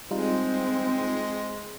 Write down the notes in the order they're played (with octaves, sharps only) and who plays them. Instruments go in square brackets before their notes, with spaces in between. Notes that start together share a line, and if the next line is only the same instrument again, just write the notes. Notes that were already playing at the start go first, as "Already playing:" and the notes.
[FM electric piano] G3 D#4 F4 [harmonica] G#3 [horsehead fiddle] C4